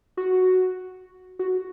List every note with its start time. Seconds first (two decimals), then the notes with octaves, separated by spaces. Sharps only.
0.17 F#4
1.39 F#4